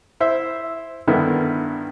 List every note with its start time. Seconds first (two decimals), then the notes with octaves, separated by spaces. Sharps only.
0.20 E4 C5 E5 E6
1.08 G2 D3 D#3 B3 E4